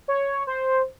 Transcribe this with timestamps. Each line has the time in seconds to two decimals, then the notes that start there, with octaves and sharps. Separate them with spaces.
0.08 C#5
0.47 C5